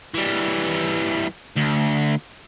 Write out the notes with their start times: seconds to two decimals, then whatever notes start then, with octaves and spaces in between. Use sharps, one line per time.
0.15 E3 G3
1.57 D2